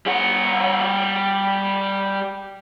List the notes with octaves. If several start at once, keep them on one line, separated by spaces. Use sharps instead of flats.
G3 F#5